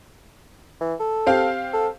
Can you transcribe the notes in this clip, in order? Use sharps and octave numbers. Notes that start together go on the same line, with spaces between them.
E3
A4
C4 G4 F5
A4